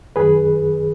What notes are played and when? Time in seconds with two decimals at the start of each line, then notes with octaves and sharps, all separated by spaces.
0.16 F#2 D#3 G#4 B4